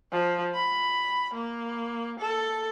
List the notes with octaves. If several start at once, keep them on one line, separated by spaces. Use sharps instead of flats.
F3
B5
A#3
A4